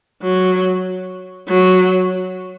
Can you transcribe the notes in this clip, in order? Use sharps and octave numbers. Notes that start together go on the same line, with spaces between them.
F#3
F#3